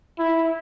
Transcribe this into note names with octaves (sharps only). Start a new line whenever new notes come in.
E4